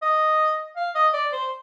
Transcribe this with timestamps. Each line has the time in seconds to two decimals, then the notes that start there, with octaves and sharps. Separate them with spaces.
0.02 D#5
0.76 F5
0.95 D#5
1.14 D5
1.32 C5